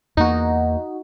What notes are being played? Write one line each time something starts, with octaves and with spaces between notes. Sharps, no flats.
E2 A#3 D#4 F#4